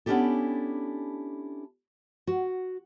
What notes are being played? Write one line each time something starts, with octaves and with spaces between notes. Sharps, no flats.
B3 C#4 D4 E4 G4 A4
F#4